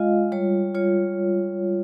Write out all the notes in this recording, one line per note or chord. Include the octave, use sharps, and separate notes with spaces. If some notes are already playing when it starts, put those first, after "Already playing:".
Already playing: G#3 F4 D#5 F5
G3 C#5
F4 C#5